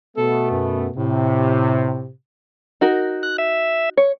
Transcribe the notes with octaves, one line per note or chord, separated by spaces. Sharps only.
B2 A3 B3 A4
F#2
A2 C3
D#4 F#4 A#4
F#6
E5
C#5